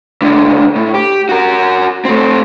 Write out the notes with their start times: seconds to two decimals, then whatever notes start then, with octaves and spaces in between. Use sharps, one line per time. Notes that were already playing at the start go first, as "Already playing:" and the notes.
0.22 C#2 D3
0.76 A2
0.94 G4
1.29 F#4 A#4
2.05 A3 C4